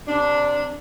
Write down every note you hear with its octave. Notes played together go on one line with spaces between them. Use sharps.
C3 D4